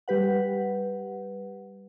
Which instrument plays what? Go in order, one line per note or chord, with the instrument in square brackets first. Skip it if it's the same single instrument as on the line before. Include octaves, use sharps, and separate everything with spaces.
[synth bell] G3 G4 B4 F#5